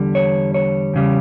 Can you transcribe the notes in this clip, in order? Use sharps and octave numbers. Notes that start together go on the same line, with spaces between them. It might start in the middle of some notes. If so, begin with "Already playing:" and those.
Already playing: E2 D3 G3
C#5
C#5
E2 C#3 G3